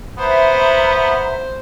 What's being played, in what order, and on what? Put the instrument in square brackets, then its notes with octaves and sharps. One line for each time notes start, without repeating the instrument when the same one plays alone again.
[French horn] B3 [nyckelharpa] C5 [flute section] E5 A#5 B5